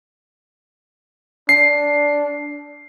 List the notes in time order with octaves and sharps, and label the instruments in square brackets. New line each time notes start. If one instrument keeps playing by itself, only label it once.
[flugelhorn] D4 [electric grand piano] C7